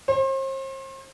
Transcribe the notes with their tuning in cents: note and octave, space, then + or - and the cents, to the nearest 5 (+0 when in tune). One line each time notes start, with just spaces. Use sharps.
C5 +40